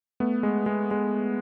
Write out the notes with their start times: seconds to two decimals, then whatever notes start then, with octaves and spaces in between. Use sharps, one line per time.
0.20 A3 B3
0.43 G#3
0.66 G#3
0.91 G#3